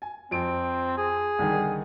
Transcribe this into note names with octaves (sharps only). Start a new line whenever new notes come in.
G#5
F2 C4 D7
G#4
C2 D3 D#3